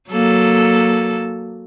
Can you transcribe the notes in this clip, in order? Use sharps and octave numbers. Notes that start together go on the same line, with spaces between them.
F#3 A#3 A4